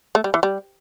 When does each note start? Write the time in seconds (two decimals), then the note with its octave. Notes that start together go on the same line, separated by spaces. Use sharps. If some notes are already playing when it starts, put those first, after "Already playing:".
0.15 A3
0.24 G3
0.34 E3
0.43 G3